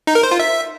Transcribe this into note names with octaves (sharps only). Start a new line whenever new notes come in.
D#4
A#4
C5
F4
E5